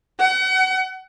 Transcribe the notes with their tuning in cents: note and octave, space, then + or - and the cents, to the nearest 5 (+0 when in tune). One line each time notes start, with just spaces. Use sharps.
F#5 +35